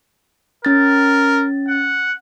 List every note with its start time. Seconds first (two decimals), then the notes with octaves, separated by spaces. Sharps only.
0.65 C#4 A#4 A6
1.68 F#5